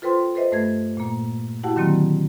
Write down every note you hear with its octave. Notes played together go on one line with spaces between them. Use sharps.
F4 A4 B4 C5 G5 C6
A4 B4 C5 D#5 E5
G2 A3 A4 B4 G#6
A#2 A#3
E4 F#4 G4 F#5 G5 A5
D3 D#3 F#3 A#3 C4